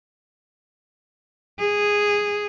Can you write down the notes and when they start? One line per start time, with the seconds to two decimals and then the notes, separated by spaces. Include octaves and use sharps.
1.59 G#4